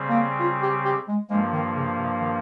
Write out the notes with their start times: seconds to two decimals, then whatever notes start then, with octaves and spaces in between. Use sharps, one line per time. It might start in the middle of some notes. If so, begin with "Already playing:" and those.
Already playing: C#3 G3 C4
0.09 A#3
0.39 F4
0.62 G4
0.85 G4
1.08 G#3
1.30 G2 F3 G#3 A#3
1.53 D#3
1.76 C#3
1.98 C3
2.20 D#3